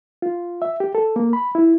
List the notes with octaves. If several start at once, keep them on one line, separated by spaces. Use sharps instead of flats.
F4
E5
G4
A4
A#3
B5
E4